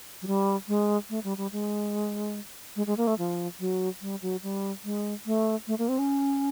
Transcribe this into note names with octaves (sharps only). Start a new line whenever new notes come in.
F#3
G3
G#3
A3
G3
G3
G#3
G#3
G#3
A#3
A3
F3
F#3
G3
F#3
G3
G#3
A3
A3
A#3
C4
C#4